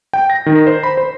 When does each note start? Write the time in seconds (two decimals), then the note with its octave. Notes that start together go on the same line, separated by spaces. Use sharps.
0.13 G5
0.30 A#6
0.46 D#3
0.67 C5
0.83 B5
0.97 C5